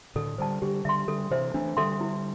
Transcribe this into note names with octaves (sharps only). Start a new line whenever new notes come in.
A2 D3 A4
D3 G3 C5 A5
D3 G3 G4
D3 G3 E5 C6
D3 G3 A4
C3 E3 C5 E5
E3 A3 D4
D3 G3 A4 E5 C6
E4